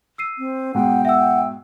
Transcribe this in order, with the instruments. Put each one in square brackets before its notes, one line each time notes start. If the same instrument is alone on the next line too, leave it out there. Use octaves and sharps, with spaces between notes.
[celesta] E6 C7 D#7
[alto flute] C4
[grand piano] G#2 B2 [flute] F#5 [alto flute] G5
[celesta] E5 E6 [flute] F#5